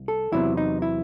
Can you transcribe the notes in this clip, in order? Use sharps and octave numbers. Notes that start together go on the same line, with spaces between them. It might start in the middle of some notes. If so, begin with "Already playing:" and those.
Already playing: C2
A4
E2 C3 F#3 B3 E4
D#4
E4